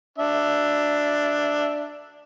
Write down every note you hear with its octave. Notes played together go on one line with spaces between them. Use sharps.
D4 E5